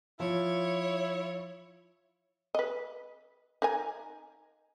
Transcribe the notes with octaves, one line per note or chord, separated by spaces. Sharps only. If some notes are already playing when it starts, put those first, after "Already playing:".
F3 E4 C#5
B4 D#5
D#4 A#4 G#5